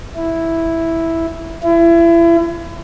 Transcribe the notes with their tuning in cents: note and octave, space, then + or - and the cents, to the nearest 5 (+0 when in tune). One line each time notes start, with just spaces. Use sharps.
E4 -5
E4 +30